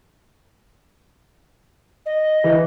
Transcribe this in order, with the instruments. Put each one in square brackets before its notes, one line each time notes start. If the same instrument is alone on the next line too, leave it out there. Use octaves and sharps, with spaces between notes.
[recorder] D#5
[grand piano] E3